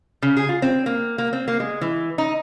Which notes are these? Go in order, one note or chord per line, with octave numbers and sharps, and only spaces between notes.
C#3
G#4
F4
C4
A#3
A#3
C4
A#3
G#3
E3
D#4